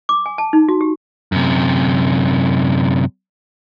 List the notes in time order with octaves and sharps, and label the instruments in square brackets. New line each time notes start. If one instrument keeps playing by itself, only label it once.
[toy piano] D6
G#5
A5
D#4
F#4
G4
[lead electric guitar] F#2 C3